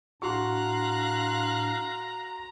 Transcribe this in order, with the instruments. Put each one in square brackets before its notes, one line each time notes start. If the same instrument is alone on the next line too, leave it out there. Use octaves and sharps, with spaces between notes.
[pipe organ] A2 D4 [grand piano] F#4 C6 C#6 [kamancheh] F5 F#6 [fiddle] A#5